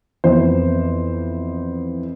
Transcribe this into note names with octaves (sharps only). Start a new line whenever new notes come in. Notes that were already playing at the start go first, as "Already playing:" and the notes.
F2 E3 B3 C5